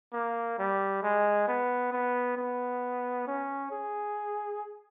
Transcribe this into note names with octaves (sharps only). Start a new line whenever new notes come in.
A#3
G3
G#3
B3
B3
B3
C#4
G#4